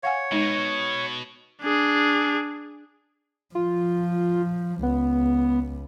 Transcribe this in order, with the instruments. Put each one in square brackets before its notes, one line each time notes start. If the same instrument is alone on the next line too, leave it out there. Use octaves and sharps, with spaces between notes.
[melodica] C#5 [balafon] F5 F#5 G#5
[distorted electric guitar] B2 [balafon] G#3 D#4
[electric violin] D4 G#4
[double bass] F3 [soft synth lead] F4
[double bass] C#2 [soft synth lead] B3